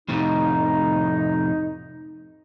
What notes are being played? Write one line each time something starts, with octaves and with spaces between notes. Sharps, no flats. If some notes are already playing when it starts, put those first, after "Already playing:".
F2 A2 C3 D#4